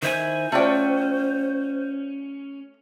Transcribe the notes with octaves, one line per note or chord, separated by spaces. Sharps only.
D#3 E4 C5 G#5
A3 C#4 F4 F#4 D5 G5